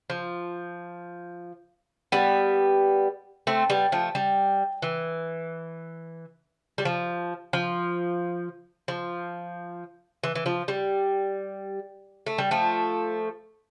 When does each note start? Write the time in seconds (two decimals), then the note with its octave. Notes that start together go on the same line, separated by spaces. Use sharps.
0.10 F3
2.12 G3 B3
3.47 A3 C4
3.70 G3 B3
3.92 F3 A3
4.15 G3
4.82 E3
6.78 G3
6.85 F3
7.53 F3
8.88 F3
10.23 E3
10.35 E3
10.46 F3
10.68 G3
12.26 A3
12.38 G3
12.51 F3 A3